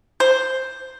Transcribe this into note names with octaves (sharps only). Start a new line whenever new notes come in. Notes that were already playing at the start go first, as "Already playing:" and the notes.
C5